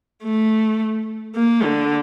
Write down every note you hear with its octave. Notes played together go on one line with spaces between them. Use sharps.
A3
A#3
D3